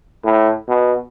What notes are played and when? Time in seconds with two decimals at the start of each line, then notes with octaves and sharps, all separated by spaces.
0.25 A2
0.68 B2